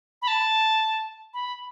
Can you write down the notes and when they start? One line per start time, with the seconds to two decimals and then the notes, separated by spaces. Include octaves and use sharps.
0.22 B5
0.28 A5
1.34 B5